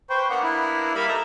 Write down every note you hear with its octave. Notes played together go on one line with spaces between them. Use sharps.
B4 C5 G5 C#6
A#3 B3 D4 F#5
E4
G3 A#3 E5 F5 B5
D#4 A4 A#4 A#5